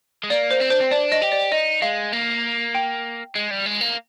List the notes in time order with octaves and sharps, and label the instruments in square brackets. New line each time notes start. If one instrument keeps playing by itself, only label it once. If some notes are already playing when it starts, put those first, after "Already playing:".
[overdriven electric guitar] G#3
[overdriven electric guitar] A#3 [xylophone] D5
[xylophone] C5
[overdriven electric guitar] C4
[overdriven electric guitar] D4 [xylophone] C5
[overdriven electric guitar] C4
[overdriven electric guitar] D4 [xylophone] D5
[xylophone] D#5
[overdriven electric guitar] G4
[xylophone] D5
[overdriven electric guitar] D#4 [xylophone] D#5
[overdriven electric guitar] G#3 [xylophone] F5
[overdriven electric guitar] A#3
[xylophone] G5
[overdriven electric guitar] G#3
G3
G#3
A#3